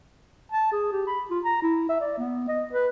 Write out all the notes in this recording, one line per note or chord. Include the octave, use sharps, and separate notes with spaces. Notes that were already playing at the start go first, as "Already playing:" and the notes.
A5
G#4
G4
B5
F4
A#5
E4
E5
D5
B3
D#5
B4